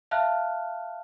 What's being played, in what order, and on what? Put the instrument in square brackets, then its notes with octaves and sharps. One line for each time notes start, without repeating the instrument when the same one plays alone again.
[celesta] E5 F5 A5 F6 F#6